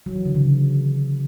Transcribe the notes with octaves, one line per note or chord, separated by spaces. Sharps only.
F#3
E3
D3
C#3